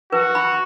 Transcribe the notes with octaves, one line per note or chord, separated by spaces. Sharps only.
F#4 B4
B5